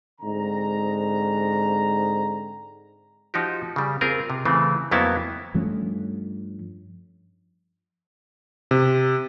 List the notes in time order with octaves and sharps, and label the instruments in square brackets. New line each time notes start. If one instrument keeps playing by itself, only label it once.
[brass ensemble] G#2 D3 C4 A#5
[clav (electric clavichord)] F3 D#4 F#4 G4
C#3 G3
C4 F4 G#4 A#4
C3
C#3 E3 A3 C4
F2 F#3 A#3 B3 E4 A5
[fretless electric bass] G2 F3 A3 C#4
[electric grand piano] C3